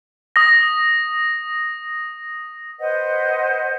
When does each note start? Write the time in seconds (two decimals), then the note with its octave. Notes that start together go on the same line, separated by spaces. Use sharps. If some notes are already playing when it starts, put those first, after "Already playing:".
0.36 D#6 A#6
2.79 B4 C5 D#5 F#5